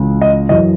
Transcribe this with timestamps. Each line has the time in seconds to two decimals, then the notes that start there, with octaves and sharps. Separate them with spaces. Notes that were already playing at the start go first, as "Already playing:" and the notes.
Already playing: C#2 C#3 E3
0.21 D#5
0.49 F#2 E3 D#5